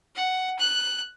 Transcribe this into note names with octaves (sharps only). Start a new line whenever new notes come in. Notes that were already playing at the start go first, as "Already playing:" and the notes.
F#5
F#6